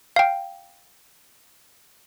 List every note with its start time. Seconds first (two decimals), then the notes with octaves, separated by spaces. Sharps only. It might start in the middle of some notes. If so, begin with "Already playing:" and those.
0.16 F5 G5